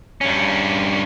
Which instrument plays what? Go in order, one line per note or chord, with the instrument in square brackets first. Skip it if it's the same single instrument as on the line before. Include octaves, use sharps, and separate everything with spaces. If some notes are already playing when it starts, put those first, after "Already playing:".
[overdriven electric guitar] G2 C#4